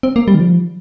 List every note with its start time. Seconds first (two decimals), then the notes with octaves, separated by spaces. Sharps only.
0.03 C4
0.16 A#3
0.28 G3
0.35 D#3
0.40 F3